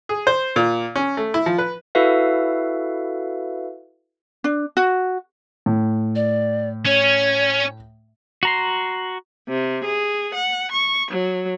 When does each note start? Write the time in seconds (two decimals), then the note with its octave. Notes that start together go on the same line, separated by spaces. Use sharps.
0.09 G#4
0.27 C5
0.56 A#2
0.95 C#4
1.17 A3
1.34 E4
1.46 F3
1.58 B4
1.95 E4 F#4 A4 B4 E5 F5
4.44 D4
4.77 F#4
5.66 A2
6.15 D5
6.86 C#4 C#5
8.43 F#4 A#5 C6
9.49 C3
9.85 G#4
10.34 F#5
10.72 C#6
11.11 F#3